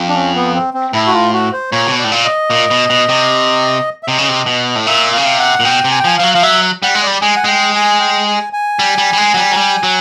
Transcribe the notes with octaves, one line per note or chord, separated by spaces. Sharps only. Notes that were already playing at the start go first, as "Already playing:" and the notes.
Already playing: F2
D4
C#4
B3
C4
C4
A2 E4
F#4
F4
F#4
C5
A#2 C#5
C3
B2
D5
A2
A#2
D#5
A#2
B2
B2
C3
E5
C3 D#5
C#3
C3
B2
A2
A#2 E5
C#3 F5
C3
F#5
A#2
B2 G5
C3
G#5
G5
F3 G#5
F3 F5
F#3
F3 F5
F#3 E5
G3 F#5
G#3
G3 D5
G#3 G#5
F#5
G#3 G5
G#5
G5
G#5
G#5
G3
G3
G3
G#3
F#3
G3
F#3
G3
F#3